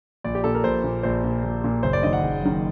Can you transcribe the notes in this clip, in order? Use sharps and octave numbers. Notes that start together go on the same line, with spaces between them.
A#1 D5
G4
A#2 A4
A#4
A#1 C5
A#2
A#1 C5
A#2
A#1
A#2
F#1 C5
D5
F#2 D#3 D#5
F#5
F#1
F#2 D#3